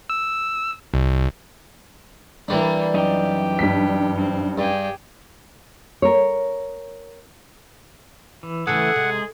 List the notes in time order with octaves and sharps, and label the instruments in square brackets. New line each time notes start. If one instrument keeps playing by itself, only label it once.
[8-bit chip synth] E6
C2
[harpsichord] E3 G3 D4 [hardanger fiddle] A#3 B5
[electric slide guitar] F#2 D#4 [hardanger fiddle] G4
[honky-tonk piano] G2 B6
[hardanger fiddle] C4
[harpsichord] G2 [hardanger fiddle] G4 G#4
[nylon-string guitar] A#4 C#5
[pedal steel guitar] E3
[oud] C#3 A4 [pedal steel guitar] E3 A3 [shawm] G#4 [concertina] F#5
[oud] C3 [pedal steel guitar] G#3